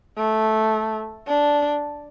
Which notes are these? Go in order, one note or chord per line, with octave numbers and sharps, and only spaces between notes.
A3
D4